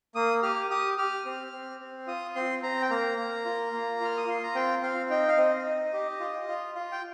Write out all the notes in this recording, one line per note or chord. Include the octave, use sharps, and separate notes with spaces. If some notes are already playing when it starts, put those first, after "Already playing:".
A#3 D#6
G4 F6
G4 D#6
G4 F6
C4
C4
C4
F4 D#6
C4 C6
C4 A#5
G5
A#3 A#5
A#3
F4
A#3
F4 F6
D#6
F4 C6
A#5
C4 G5
C4 F5
D#4 G5
F5
C4 D#5
D#4
G4
F4
F4
F4
G5